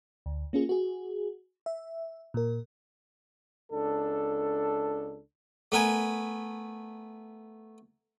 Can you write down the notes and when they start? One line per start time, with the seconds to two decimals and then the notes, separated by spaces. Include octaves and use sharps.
0.26 D2
0.53 A#3 C#4 F4 G#4
0.69 F#4 G#4
1.66 E5
2.34 A#2 A#4
3.72 C#2 D4 A4
5.72 A3 B3 A#4 G#5